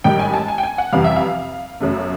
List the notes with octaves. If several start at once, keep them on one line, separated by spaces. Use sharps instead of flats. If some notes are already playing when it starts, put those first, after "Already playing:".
A1 G#2 D#3 G3 G5
G#5
A5
G#5
G5
G#5
F#5
F2 C3 E3 G3 F5
E5
F5
G1 F#2 C#3 F#3 A3